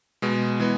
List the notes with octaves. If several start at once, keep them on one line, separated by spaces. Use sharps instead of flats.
B2 G#3 B3
E3 G#3 B3